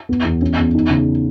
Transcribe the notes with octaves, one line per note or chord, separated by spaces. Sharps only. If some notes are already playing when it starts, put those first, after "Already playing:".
B3
E2
C#4
E2
D#4
C#3